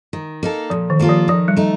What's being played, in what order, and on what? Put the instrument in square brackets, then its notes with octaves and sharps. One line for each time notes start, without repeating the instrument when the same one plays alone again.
[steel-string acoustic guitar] D#3
A#3 D#4 A4
[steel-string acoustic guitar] A#2 [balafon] F3
[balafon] D#3
[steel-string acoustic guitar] G3 A#3 F4 A4
[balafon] F3
[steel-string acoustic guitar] D#3 [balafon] F3
[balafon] G3
[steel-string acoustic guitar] A3 D#4